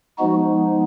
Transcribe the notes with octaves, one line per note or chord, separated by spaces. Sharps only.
F3 G#3 B3 D#4 F#4